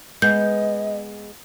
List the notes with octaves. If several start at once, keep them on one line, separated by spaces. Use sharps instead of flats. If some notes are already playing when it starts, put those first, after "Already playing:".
G#3 B3 D#5 G6